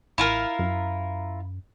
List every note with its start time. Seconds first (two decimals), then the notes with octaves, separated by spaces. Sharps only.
0.18 A1 E4 F4 A#4
0.59 F#2